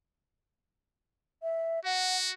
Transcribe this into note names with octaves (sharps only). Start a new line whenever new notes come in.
E5
F#4 F#5